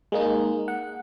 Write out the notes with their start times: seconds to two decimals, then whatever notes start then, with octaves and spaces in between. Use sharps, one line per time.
0.12 G#3 A#3 D#4
0.68 F#5